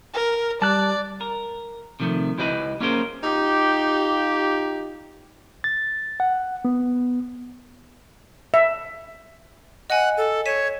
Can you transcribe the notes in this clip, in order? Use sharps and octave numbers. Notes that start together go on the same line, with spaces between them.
A#4
G3 D5 A5 F#6
A#4
C3 D#3 F3 A3
C#2 E4 G4 B4 D#5 B5
A#3 C#4 F4 G#4 A#4 C5
D#4 F4 G4
A6
F#5
B3
E5
D#5 F#5 G#5
A4
C#5 B6 D#7 E7